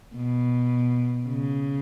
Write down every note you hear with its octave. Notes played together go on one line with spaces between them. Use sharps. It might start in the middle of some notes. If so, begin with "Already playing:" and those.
B2
C#3